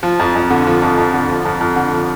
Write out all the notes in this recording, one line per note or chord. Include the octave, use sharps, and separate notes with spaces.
F3
F2
F2
D3
F3
F2
F2
D3
F3
F2
F2
D3
F3